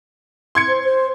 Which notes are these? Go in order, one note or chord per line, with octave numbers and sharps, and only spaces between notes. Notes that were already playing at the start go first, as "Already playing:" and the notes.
C6 G#6 C#7
C5
C5